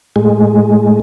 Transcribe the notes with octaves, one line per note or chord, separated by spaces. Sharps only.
A2 G#3